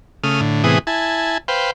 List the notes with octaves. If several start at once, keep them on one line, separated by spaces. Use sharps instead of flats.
C#3 A3 D#6 F6
A2 D3
A2 C3 E3 B3 G#4 D#6
E4 G#5 A5
B4 C5 F5 G5